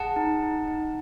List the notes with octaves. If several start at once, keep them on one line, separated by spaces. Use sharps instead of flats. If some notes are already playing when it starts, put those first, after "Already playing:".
Already playing: G#4 F#5 A5
D#4
D#4
D#4